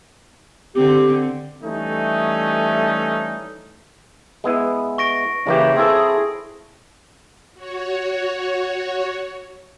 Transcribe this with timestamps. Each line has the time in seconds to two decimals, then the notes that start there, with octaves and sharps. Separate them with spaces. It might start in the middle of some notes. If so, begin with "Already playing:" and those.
0.76 D3 C4 G4
1.63 E3 G3 A3 C#4 D#4
4.44 G#3 B3 E4
4.98 C#6 A#6 D7
5.47 C#3 E3 A#3 G4
5.77 C4 E4 G#4 A4
7.54 F#4 C#5